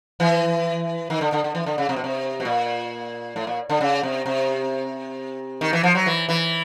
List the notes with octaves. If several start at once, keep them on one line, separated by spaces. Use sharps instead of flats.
E3
D#3
D3
D3
D3
E3
D3
C#3
C3
B2
C3
B2
A#2
A2
A#2
D3
C#3
C3
C3
D#3
E3
F3
F#3
E3
E3